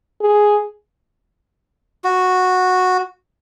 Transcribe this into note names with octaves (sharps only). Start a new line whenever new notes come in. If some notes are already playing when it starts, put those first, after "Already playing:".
G#4
F#4